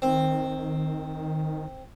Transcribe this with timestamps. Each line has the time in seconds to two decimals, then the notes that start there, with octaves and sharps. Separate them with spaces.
0.02 D#3 C4